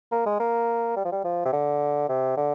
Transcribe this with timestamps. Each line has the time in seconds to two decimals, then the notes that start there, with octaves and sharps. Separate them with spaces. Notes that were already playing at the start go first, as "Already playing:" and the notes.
0.12 A#3
0.26 G#3
0.40 A#3
0.96 G3
1.05 F3
1.12 G3
1.24 F3
1.45 C3
1.53 D3
2.09 C3
2.37 D3